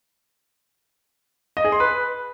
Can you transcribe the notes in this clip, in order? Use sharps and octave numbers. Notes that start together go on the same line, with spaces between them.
D#5
G#4
C6
B4